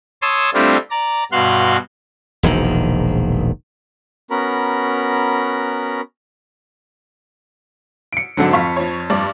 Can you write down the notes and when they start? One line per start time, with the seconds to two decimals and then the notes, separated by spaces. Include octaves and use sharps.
0.22 C#5 A5 C6 D#6 E6
0.54 G3 A3 C4 D4 E4 F4
0.90 D5 A#5
1.32 G2 B2 F#4 F5 C6 F#6
2.43 E1 A#1 D#3
4.31 B3 C#4 F#4 A#4 A#5 B5
8.13 C#7 D7
8.37 G#2 D3 F#3 C4 A4 A5
8.53 F2 F5 C#6 B6
8.76 F3 C#5
9.10 G2 D5